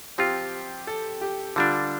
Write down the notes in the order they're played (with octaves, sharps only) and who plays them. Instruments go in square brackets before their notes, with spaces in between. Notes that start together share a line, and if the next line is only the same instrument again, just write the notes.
[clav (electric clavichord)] F3 C4 F4 [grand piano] G4
[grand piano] A4
G4
[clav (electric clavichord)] D3 G3 D4 [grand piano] F4